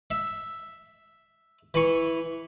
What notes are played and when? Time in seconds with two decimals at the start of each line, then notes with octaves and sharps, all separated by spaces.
0.11 E5
1.74 E3 C#6